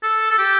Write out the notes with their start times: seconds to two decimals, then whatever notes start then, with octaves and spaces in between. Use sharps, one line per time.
0.03 A4
0.31 A4
0.38 G4